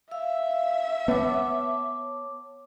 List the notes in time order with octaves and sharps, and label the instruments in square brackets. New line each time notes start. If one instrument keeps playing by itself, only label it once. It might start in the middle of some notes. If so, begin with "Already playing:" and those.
[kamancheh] E5 [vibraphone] F5 E6
[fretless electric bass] B3 [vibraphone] C#5 A5 D6